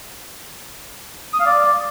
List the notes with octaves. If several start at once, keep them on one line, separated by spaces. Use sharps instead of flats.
D#6
F5
D5